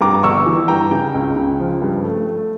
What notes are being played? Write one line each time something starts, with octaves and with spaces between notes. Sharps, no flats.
G2 A#5 D6
G1 C#6 E6
E3
G2 G5 A#5
C#3 G5
C#2
C#3
F3
G2
A3
A3